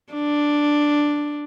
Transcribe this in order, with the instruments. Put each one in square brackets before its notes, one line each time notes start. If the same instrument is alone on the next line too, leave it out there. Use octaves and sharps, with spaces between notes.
[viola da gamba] D4